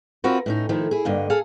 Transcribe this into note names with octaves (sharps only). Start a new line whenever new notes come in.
C4 F4 F#4 A#4 B4
A2 C#4 D#4
D#3 F3 A3 E4
E4 G#4
G2 D3 A#3 D#5
G#4 A4 F5